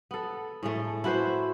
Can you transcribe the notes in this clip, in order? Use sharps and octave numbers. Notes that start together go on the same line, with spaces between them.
B3 A4
A2 G#3 A3
E4 F#4 B4 C5